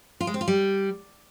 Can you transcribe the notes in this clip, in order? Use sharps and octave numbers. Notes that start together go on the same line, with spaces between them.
F4
G#3
C4
F4
G3